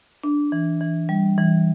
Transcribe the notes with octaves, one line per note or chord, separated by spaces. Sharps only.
D4
E3
E3
G3
E3